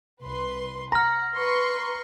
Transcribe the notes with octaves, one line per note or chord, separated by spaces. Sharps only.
C2 B4 C6
F#5 A#5 F6 A#6
B4 C6 C#6